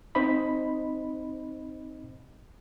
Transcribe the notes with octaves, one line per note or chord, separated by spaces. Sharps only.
C4 D#4 C5 D#5 B5